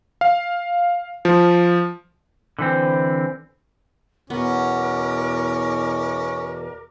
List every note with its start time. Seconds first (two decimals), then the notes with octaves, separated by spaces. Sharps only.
0.21 F5
1.25 F3
2.59 D3 E3 C4
4.30 E2 B2 B3 C#4 A#4 D6